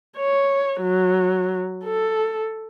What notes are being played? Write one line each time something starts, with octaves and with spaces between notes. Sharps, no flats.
C#5
F#3
A4